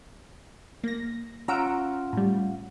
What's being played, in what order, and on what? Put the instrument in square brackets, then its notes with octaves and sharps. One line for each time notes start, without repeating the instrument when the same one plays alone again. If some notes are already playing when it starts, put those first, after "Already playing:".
[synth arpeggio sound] A#3 A#6
[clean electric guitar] C#4 F4 F#5 [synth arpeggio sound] A#5 E6 D7
[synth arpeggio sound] A2 G3